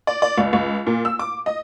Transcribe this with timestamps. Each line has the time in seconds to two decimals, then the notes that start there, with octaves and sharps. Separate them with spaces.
0.07 D5
0.22 D5
0.38 C#2
0.53 C#2
0.87 A#2
1.05 E6
1.19 D6
1.46 D#5